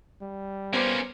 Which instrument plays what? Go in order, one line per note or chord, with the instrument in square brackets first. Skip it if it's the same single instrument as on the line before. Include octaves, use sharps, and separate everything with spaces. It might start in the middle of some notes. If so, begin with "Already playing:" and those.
[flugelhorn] G3
[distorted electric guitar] A#3 C#4 [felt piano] B3 C5 D6